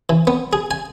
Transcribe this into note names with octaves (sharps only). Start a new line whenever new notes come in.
E3
B3
G#4
G#5